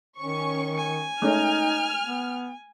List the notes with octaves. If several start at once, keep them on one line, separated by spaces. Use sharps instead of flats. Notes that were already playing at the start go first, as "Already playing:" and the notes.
D#3 C#4 C#6
G#5
G#3 A3 C#4 D#4 F6
B3